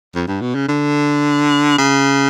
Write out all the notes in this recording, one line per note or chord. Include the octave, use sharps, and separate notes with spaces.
F2
G2
B2
C#3
D3
C#3